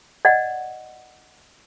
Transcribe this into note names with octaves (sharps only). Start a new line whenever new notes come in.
D5 D#5 F#5